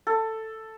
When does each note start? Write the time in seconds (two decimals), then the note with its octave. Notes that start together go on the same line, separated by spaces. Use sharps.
0.07 A4